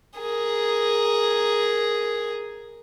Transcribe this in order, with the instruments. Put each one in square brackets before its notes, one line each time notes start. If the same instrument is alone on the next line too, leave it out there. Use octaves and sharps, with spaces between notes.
[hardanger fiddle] G#4 A#4